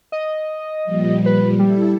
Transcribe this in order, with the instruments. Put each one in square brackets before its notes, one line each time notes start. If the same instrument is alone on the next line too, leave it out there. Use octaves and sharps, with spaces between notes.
[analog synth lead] D#5
[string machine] A#2 F3 G3
[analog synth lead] B4
[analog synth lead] G3 [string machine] E4 A4